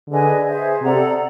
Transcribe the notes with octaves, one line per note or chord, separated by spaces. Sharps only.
D3 G#4 B4 D#5 G#5
G#4 C5 E5
C3 A4 D5 F#5 A#5